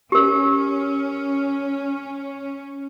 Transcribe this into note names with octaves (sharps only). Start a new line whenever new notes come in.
C#4 G4 A#4